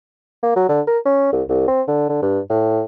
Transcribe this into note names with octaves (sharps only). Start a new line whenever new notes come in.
A#3
F#3
D3
A#4
C#4
C2
C2
C4
D3
D3
G2
A2